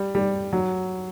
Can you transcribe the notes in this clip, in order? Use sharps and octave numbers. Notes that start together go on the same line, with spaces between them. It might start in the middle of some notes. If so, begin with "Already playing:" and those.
Already playing: G3
G3
F#3